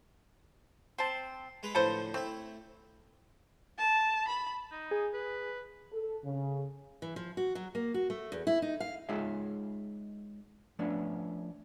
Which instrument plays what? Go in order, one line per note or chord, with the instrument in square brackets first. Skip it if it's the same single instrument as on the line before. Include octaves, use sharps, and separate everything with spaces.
[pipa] C4 A5 [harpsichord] C6
[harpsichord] G#3 B4 A#5
[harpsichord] A2 D3 F3 [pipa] A4 B4 C5
[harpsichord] A3 E4 [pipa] C4
[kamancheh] A5
B5
[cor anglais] D#4
[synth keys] G#4
[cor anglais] B4
[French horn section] A4
C#3
[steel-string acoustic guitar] E3
F3
F#4
F#3
A#3
F#4
A3
E2
E4
D#4
F5
[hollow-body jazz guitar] G#3 D#4 F4 G#4 C#5 E5
F3 A3 B3 C#4 D4